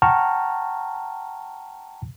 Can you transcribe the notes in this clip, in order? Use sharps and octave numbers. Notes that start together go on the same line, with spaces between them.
F#5 G5 A5 A#5 C#6 F6